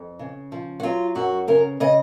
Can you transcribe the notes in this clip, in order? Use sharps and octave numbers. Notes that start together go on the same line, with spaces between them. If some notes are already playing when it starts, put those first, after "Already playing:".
Already playing: F2
C#3
F3
F#4
F#3 F4
F#2 F#4
C#3 A#4
C#3 D#5